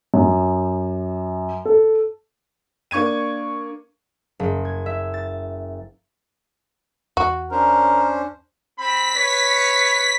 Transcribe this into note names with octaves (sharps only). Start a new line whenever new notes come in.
F#2
A4
A#3 D4 C#6 G#6 D#7
F#1
G#6
E5
A6
E2 F#4
C#4 D4 A#4 C5
C4 B5 B6
B4 C#5